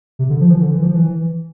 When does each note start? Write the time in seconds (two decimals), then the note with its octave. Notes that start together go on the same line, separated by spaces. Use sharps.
0.19 C3
0.30 D3
0.40 F3
0.50 E3
0.61 D3
0.72 E3
0.82 F3
0.93 E3